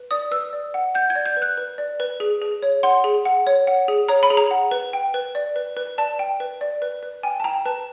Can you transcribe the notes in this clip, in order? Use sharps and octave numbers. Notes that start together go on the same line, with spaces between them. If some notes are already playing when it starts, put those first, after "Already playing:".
Already playing: B4
D5 D#6
B4 E6
D5
F#5
F#5 G6
G#6
D5
G6
B4
F#6
B4
D5
B4
G#4
G#4
C#5
F#5 C6
G#4
F#5
C#5
F#5
G#4
C#5 A#5
B5
G#4
A#5
F#5
B4
G5
B4
D5
B4
B4
D5 A5
G5
B4
D5
B4
B4
G5 G#5
A5
G5 A#5
B4 A5